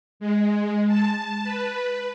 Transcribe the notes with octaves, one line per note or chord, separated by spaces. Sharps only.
G#3
A5
B4